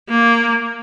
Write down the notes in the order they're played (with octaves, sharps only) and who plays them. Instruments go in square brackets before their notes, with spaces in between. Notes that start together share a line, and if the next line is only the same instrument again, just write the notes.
[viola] A#3